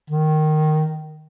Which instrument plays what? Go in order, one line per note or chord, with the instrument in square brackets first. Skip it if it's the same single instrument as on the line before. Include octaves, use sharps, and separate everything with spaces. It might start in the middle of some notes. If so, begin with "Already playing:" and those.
[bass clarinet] D#3